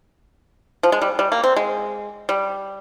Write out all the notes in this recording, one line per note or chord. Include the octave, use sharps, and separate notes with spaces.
F3
G#3
G3
G3
A#3
C4
G#3
G3